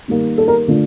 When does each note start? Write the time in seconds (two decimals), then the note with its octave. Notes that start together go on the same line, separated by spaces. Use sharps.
0.08 D#3 G3 A#3
0.38 A4
0.48 A#4
0.68 D3 A3 D4 F4